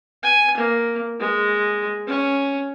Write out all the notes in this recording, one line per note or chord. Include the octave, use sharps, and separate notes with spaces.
G#5
A#3
G#3
C#4